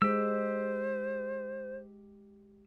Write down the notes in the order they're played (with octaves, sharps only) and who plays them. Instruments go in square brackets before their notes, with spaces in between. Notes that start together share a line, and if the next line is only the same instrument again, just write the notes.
[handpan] G#3 [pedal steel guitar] G4 E6 [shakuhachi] C5